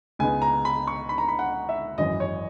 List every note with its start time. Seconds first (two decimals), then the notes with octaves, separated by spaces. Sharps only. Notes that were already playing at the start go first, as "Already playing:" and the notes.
0.19 C#2 C#3 G#3 B3 D#4 G#5
0.42 A#5
0.65 B5
0.87 C#6
1.09 B5
1.18 A#5
1.28 B5
1.39 F#5
1.69 E5
1.98 G#1 F#2 E3 D#5
2.20 C#5